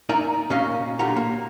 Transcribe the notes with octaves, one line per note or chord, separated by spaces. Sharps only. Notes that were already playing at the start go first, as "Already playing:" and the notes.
D#4 A#4 D5 E5 G#5 A#5
A#2 C#4 F#4 D#5 F5
B1 A#2 D3 G4 F#5 A#5
A#3